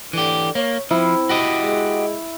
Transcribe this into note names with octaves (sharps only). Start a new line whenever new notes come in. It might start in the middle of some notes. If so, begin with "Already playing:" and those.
D3 E3 G4
A#3 C#5
F3 C4 E4
F#4 G4 D#5
G#3